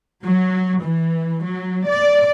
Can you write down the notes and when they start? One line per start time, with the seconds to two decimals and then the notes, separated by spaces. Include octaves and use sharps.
0.25 F#3
0.85 E3
1.47 F#3
1.89 D5